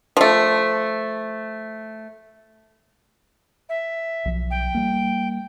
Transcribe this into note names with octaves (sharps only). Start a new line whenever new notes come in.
F3 A3
E5
B1 F3
G5
G3 A#3